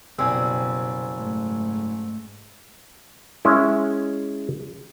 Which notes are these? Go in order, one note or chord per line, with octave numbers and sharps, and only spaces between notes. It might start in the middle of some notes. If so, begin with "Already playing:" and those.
F#1 B2 G3 C4 G#5 E6
G#2 A3
G#3 C#4 E4